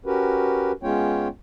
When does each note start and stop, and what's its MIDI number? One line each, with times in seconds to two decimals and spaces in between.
0.06 0.72 61
0.06 0.72 66
0.06 0.72 67
0.06 0.72 70
0.06 0.72 71
0.83 1.28 56
0.83 1.28 59
0.83 1.28 61
0.83 1.28 65
0.83 1.28 73
0.83 1.28 79